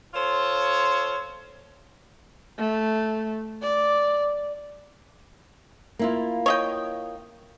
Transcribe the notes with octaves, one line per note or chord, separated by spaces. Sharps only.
F4 A4 C5 C#5
A3
D5
A#3 E4 F4
C#5 D#5 G5